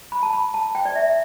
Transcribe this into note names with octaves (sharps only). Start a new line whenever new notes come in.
B5
A5
B5
A5
G5
D5
E5